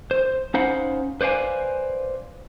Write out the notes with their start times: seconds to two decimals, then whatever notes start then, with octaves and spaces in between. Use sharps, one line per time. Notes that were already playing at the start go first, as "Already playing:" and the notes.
0.11 C5
0.54 C#4 D#4 C5 F5 F#5 B5
1.21 B4 C5 D5 F5 G#5